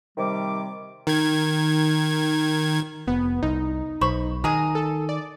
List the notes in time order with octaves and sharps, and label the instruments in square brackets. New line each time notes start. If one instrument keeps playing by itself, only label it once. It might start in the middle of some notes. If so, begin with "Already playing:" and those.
[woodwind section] C3 D#3 G3 D6
[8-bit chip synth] D#3 G#6
[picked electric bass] F1 [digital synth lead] B3
[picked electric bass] C2 [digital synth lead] D#4
[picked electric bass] B1 [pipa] C5 B5 C#6
[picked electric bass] D#3 [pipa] G#3 G#4 [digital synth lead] A#5
[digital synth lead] A4
D5